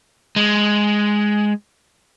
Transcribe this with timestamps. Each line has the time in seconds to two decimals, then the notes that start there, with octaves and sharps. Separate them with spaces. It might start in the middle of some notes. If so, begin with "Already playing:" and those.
0.36 G#3